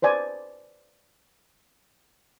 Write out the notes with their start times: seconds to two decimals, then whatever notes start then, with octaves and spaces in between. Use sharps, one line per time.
0.02 B4 C5 D5 G#5